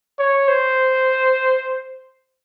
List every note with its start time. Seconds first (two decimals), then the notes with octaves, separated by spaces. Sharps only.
0.19 C#5
0.48 C5